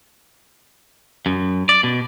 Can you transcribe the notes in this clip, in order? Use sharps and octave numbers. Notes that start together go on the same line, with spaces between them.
F#2
D5
B2